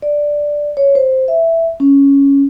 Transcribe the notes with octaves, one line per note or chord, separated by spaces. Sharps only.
D5
C#5
C5
E5
C#4